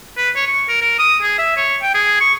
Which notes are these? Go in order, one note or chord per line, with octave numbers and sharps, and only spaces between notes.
B4
C#5
C#6
A#4
A#4
D#6
G#4
E5
C#5
G5
G#4
C#6